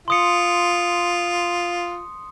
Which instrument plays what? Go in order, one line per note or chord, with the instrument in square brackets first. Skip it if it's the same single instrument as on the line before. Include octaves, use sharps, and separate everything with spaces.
[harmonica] F4 [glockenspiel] C6 D#6 C#7